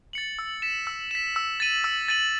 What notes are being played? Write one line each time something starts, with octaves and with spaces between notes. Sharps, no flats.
A6 C#7 F#7
E6
B6 E7
E6
B6 E7
E6
A6 D#7 F#7
E6
A6 D#7 F#7